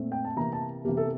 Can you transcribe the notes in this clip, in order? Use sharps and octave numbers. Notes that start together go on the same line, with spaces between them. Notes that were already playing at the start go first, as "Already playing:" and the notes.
Already playing: A#2 A3 C4
G5
A5
C3 E3 A#3 A#5
A5
C3 E3 A#3 G4
A4